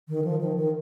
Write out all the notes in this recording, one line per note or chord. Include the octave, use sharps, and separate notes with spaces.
D#3
F3
D#3
D#3